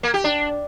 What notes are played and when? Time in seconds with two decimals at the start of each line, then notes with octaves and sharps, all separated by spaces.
0.03 A#3
0.14 G4
0.24 D4